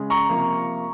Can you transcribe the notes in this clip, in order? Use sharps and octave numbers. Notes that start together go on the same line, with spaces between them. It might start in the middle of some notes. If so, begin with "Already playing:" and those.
Already playing: C#3 G#3
A#5 C#6
C3 F3 A#3